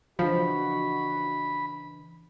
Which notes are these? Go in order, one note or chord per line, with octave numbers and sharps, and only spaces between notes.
C#3 E3 F3 D4 F#4 B5